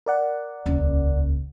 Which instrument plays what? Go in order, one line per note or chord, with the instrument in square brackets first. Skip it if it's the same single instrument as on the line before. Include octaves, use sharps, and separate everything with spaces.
[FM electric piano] A#4 D5 F#5
[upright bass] D#1 C#2